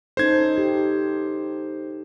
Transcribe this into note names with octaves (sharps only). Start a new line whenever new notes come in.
C#4 D#4 A4 C5 G#6
G4